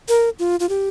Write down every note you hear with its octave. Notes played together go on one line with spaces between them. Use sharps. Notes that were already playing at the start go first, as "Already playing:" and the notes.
A#4
F4
F4
G4